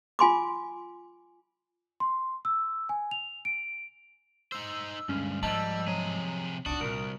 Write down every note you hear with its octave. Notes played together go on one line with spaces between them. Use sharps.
F4 G#5 C6 D6
C6
E6
G#5
F7
D7
D#4 C5 E6
D2 G2 G#3 C#4
G#2 F3 G3 D#5 A5 E6
C3 F#3 G#4
C2 D4 D#4 F#4 D#6
C2 A#2 F#4 A#4